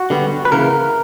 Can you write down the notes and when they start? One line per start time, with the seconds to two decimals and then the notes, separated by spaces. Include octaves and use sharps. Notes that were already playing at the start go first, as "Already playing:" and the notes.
Already playing: F#4
0.10 D3 G3 B3
0.45 B4
0.52 C#3 E3 A#3 A#4